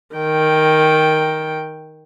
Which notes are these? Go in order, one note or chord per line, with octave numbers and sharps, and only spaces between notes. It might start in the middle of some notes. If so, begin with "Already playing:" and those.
D#3 G5